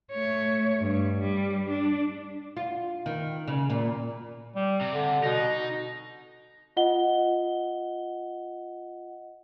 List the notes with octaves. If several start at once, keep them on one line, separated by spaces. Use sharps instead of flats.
A3 C#5
G2
G3
D4
F4
D#3
C#3
A#2
G3
C3
D3
B2 D#4
F4 D#5 F#5 G7